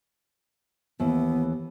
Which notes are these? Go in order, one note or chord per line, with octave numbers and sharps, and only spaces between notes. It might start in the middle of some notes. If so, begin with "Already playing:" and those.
D#2 E3 B3